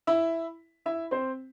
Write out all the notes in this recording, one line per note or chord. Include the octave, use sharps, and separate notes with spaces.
E4 E5
E4 E5
C4 C5